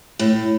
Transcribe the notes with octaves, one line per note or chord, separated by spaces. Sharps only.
A2